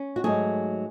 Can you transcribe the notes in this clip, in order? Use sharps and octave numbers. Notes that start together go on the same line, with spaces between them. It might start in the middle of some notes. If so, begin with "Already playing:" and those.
Already playing: C#4
F#4
G#2 F#3 A3 G#4